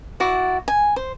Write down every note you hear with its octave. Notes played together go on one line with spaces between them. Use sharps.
E4 F#4 D5 F#5
G#5
C5